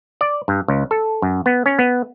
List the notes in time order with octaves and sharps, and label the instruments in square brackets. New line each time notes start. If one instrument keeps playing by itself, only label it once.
[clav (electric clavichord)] D5
G2
C#2
A4
F#2
B3
C#4
B3